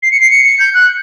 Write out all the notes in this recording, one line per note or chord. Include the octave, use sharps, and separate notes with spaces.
C7
C#7
C7
C#7
C#7
G6
F#6